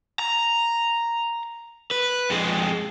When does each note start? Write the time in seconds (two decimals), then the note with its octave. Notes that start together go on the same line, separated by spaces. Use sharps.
0.19 A#5
1.91 B4
2.30 F2 G#3